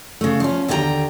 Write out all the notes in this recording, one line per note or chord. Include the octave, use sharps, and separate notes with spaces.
C#3 A3
F3 C#4
D#2 D3 F#4 B4 G5 A#5